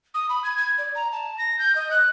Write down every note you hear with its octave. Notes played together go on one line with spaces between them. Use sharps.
D#6
B5
G#6
G#6
D5
A#5
A5
A#6
G6
D#5
F#6